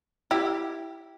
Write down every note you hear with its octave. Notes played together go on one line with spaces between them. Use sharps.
E4 G4